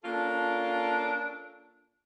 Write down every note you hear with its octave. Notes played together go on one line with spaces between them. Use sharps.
A#3 C#4 D4 F4 A4